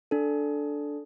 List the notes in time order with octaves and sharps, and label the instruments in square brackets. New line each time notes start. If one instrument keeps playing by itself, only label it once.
[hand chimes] D4 A4